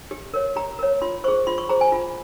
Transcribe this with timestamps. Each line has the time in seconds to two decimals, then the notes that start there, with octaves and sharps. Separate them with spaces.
0.11 G4
0.34 A#4 C#5
0.56 G4 A#5
0.79 A#4 C#5
1.02 F4 C6
1.24 G#4 C5 C#6
1.47 F4 C6
1.58 C#6
1.69 G#4 C5 A#5
1.81 G#5
1.92 F4